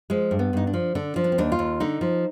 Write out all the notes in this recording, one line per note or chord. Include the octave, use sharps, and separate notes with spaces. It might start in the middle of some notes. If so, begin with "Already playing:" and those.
F3 G#3
G2
B3
G2 D#4
D4
F3
D3 D4
F3
D4
C4
D#2 D4
F4
D#2
D3 D#4
F3